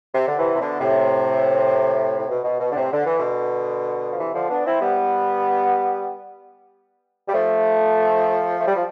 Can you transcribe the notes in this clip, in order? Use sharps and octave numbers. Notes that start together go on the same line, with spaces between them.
C3
D3
C3 E3
C3
B2 D3
A2 C3
A2
B2
B2
B2
D3
A2 C3
D3
E3
B2 D3
F3
C3 E3
D3 F3
B3 D4
C4 E4
G3 B3
G3
F3 A3
A3
G3
F3